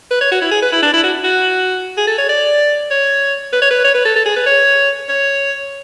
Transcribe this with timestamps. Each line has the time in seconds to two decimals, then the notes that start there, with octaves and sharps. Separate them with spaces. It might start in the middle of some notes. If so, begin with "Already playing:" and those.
0.11 B4
0.21 C#5
0.31 F#4
0.41 E4
0.51 G#4
0.62 B4
0.72 E4
0.82 D4
0.93 E4
1.03 F#4
1.24 F#4
1.97 G#4
2.07 A4
2.18 C#5
2.29 D5
2.91 C#5
3.52 B4
3.62 C#5
3.70 B4
3.84 C#5
3.94 B4
4.05 A4
4.16 A4
4.25 G#4
4.36 B4
4.46 C#5
5.09 C#5